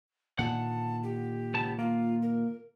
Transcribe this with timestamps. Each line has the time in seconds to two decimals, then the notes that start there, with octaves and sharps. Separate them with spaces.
0.39 A#2 D3 D#3 F#5 A5
1.03 G4
1.54 C#2 B3 A5
1.79 A#3 F4
2.22 A#4